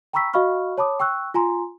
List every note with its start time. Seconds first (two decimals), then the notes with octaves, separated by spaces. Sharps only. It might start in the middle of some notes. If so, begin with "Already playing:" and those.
0.13 G5 A#5 B5 C#6 E6 B6
0.34 F#4 D#5 F5 B5 C#6 F6
0.78 C#5 A5 B5 D6 D#6
1.00 G5 C#6 E6 F#6
1.34 F4 G#5 A#5 C6